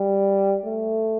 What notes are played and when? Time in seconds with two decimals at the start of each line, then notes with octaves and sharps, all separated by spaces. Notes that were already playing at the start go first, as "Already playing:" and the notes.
Already playing: G3
0.64 A3